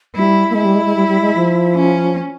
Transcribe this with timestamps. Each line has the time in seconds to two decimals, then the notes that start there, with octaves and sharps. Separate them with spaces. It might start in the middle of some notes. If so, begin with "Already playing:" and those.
0.15 G3 E4
0.50 A#3
0.55 G#3 E4
0.65 G3
0.75 G#3
0.86 G#3
0.96 G3
1.08 G3
1.22 G#3
1.36 F3
1.75 C#4